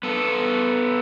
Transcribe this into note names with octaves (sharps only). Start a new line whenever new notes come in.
B3 A4